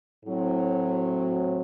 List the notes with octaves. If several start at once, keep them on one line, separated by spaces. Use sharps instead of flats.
A2 F#3 C4